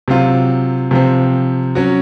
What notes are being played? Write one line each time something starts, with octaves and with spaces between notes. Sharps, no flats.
C3 F#3 C4 F4
C3 F3 C4
F#3 C#4 F#4